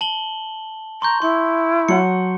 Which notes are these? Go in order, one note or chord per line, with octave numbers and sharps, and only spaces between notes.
A5 F#7 G7
A#5 C6 C#6 G6
E4 C6
F#3 F#5 C#7